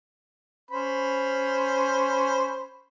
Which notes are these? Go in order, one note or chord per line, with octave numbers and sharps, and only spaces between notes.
C#4 C5 B5